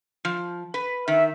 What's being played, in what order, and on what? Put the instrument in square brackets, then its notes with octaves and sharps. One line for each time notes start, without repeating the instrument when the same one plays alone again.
[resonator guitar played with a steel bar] F3
B4
[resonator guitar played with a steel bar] D#3 [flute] E5